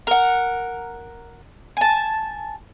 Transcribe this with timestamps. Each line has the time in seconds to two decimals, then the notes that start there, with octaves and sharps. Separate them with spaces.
0.07 A#4 F#5
1.77 G#5 A5